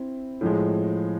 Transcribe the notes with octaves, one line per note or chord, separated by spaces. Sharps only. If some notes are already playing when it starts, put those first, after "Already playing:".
Already playing: C4 E4
A2 F3 G#3